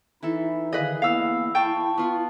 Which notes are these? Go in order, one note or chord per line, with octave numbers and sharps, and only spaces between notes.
E3 D#4 E4 A4
D3 D#3 G#4 B4 D#5 F5
A#3 B3 E4 F5 E6
G5 A5 C#6
B3 F4